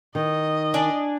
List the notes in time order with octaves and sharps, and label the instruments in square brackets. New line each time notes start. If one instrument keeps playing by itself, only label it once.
[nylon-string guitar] D#3 [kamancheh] D#5
[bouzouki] D4 D5 G#5